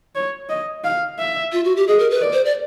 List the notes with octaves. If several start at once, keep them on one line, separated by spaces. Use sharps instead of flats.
C#5
D#5
F5
E5
F4
F#4
G4
G#4 D#5
A#4
B4
D5
C5
D5